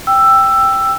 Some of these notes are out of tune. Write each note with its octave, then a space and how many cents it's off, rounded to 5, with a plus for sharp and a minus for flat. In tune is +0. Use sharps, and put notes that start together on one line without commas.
G5 +0 E6 +10